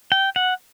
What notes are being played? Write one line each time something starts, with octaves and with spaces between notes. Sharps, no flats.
G5
F#5